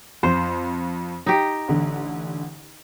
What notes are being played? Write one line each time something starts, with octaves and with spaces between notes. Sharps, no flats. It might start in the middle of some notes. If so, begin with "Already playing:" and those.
F2 C5
D#4 G4
A1 D3